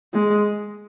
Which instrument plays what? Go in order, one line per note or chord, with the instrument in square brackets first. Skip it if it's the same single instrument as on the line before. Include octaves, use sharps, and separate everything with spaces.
[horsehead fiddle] G#3